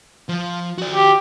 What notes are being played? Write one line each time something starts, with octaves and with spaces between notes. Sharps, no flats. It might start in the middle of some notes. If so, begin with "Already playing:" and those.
F3
F#4 D5
G4